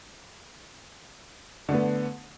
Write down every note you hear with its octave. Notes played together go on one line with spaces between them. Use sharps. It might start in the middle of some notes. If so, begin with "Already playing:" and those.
D3 A3 B3